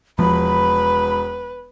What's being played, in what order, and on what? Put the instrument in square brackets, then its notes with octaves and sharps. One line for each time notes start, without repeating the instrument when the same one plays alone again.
[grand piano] E1 [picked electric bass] F3 [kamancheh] B4 [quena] B5